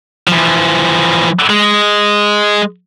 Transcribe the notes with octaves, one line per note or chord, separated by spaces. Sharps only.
E3 F3
G#3